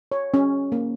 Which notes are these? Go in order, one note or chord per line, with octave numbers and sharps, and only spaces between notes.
C#5
C#4
A#3